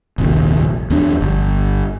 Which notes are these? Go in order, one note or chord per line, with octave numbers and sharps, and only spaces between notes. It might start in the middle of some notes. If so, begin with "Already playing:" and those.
F1 A#1 D#2
E2 F3 D4
G1